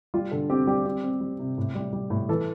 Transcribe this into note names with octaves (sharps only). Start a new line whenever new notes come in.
G3 F4
D3 A4
C4 G4
G3 G4
C4 G4
C4
G3
C3
A2
G3
G3
A2
E3 A4